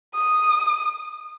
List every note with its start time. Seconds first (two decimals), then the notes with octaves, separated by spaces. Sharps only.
0.15 D#6